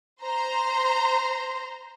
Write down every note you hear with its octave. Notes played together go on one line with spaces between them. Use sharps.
C5 A#5 C6